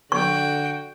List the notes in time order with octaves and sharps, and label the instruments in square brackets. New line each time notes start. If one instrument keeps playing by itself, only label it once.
[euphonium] D3 [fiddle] F#4 G5 [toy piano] C#6